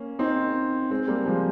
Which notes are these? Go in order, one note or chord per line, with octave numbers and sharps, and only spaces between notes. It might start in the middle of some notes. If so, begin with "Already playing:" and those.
Already playing: A#3 C#4
C4 D#4
G#3 C4
G3 A#3
F3 G#3